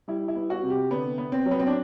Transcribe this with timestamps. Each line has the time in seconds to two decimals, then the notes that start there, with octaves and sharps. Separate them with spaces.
0.08 G3 E4
0.28 E4
0.35 B3
0.50 F#4
0.63 C3
0.70 G4
0.90 D3 B3
1.18 B3
1.32 C4
1.46 F#3
1.51 B3
1.60 C4
1.67 D4